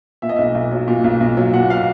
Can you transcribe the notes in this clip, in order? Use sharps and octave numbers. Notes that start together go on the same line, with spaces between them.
A#2 E5
D#5
B1 E5
B1
F#3
A#2
B1
B1
F#3
A#2 F#5
F5